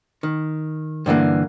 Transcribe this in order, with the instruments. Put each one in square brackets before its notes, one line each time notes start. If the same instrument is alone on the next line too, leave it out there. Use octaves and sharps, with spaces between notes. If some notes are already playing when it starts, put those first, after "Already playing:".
[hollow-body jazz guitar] D#3
G2 D3 E3 A#3